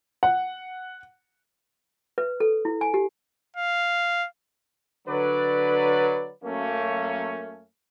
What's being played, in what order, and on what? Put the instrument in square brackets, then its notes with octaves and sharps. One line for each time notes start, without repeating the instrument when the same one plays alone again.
[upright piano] F#5
[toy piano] B4
A4
E4
G#5
G4
[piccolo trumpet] F5
[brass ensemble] D3 F#3 B4 D5
F#2 A3 A#3 C#4